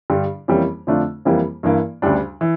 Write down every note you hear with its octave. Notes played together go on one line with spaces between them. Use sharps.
G2 D3 G3
F2 E3 G3 A#3 C#4
F2 D3 A3 D4 F4
F2 E3 G3 A#3
G2 E3 A#3
D2 C#3 G3 D4
E3